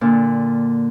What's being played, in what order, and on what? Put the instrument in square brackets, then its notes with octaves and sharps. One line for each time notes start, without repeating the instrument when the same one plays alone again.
[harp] A#2 D3